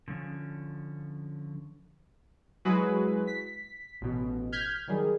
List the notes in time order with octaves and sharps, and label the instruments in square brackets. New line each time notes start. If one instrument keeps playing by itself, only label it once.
[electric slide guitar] D3 F3 C#4
[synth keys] F#3 G#3 E4 F#4 G#4 B4
B6
A1 B2
F6 G6 G#6 B6
D#3 F#3 G3 G#4